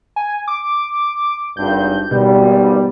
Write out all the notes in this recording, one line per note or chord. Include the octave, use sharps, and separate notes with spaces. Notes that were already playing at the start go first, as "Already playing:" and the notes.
G#5
D6
G#1 G2 G6
G#1 B2 G3